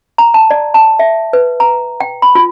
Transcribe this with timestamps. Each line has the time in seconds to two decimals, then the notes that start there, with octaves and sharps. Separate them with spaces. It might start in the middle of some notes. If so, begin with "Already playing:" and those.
0.18 A#5
0.34 A5
0.50 D5
0.74 A5
0.99 E5
1.33 B4
1.60 A#5
2.00 G5
2.22 B5
2.35 F4